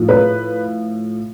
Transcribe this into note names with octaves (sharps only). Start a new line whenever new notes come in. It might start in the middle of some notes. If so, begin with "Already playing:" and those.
Already playing: A2 F3
B4